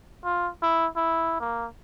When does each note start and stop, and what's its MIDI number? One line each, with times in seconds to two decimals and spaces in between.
0.24 0.49 65
0.62 0.86 64
0.96 1.36 64
1.40 1.66 58